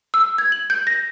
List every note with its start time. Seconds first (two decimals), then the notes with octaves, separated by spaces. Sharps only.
0.14 E6
0.38 G#6
0.52 F#7
0.70 G6
0.87 A#6